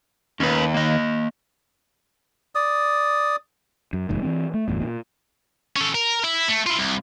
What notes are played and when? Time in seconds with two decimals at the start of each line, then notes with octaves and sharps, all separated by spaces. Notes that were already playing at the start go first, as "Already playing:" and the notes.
0.40 D#2 C#4 B4
0.74 A#3 D#5
2.55 D5 D#6
3.93 F#2
4.09 F1 D#2 G#2 D#3
4.23 E3 F3 C4
4.54 A3
4.68 G1 E2 A2
4.82 A#2
5.76 C#4 A4
5.95 A#4
6.24 E4
6.49 A3
6.67 E4 F4
6.79 C2